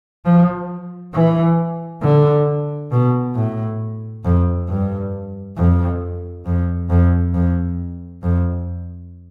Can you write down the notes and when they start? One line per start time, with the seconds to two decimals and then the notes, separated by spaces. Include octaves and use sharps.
0.25 F3
1.14 E3
2.02 D3
2.91 B2
3.35 A2
4.24 F2
4.68 G2
5.57 F2
6.46 F2
6.90 F2
7.34 F2
8.23 F2